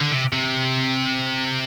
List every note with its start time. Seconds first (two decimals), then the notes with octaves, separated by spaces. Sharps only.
0.01 D3
0.12 C3
0.33 C3